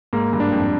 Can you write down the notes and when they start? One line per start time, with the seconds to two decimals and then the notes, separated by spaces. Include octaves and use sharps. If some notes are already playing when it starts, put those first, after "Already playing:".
0.13 G#2 A#3
0.33 G2
0.40 D4
0.53 F2